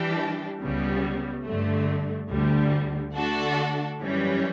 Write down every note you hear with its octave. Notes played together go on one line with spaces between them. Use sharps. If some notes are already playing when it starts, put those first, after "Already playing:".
Already playing: E3 G3 D4 G4
C#2 C#3 G3 B3
G2 D3 A3
D2 D3 G3
D3 A3 D4 F#4 A4
F#2 E3 G3 C#4